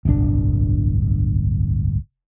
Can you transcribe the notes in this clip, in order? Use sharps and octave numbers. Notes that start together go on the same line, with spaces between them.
D1 G1 C2 D4